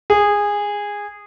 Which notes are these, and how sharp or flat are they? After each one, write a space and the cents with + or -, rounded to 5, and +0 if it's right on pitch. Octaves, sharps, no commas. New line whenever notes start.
G#4 -15